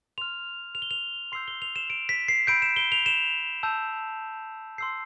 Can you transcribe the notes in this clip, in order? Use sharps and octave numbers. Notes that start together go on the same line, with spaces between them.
C6 F6 F7
F7
G7
F7
C6 E6 G6 C7
G7
F7
E7
D7
B6
C7
B5 E6 G6 D7
E7
G7
F7
E7
A5 E6 G6
C6 E6 G6 C7